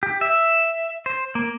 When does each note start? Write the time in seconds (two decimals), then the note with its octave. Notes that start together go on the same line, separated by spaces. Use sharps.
0.03 G4
0.21 E5
1.06 C5
1.35 A#3